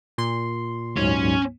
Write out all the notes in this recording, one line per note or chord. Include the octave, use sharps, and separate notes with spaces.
A#2 C6
D2 G#2 F#3 C#4